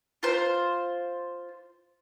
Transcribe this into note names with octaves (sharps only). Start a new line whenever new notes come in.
F4 C5